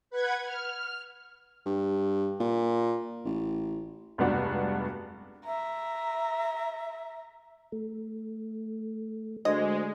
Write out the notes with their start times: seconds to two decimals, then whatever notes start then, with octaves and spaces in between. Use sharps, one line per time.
0.10 B4 F#5 G#6
0.45 F6
1.65 G2
2.40 A#2
3.25 A1
4.18 F1 C#2 G2 B3 D4 F#4
5.46 E5 A#5
7.72 A3
9.45 D2 G#3 C5 D5 D#5 G#5